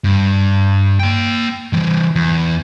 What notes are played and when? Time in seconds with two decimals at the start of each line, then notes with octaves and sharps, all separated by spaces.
0.04 G2
1.00 A#3 G5
1.73 E3 G3
2.15 E2